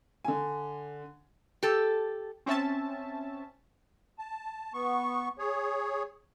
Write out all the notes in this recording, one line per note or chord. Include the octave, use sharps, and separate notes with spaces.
D3 G#5
G4 A4
C4 C#4 E5 A5
A5
B3 C#6
G#4 C#5